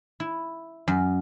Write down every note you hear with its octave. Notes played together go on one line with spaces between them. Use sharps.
E4
F#2